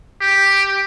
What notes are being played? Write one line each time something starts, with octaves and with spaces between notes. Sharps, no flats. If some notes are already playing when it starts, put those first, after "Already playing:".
G4